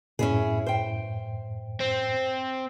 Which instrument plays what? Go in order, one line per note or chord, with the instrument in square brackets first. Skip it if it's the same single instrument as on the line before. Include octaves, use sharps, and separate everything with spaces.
[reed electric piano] F#2 A2 [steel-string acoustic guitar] C#4 E4 G#4
[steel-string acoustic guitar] C5 G5
[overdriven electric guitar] C4